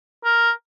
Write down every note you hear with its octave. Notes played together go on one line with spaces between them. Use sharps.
A#4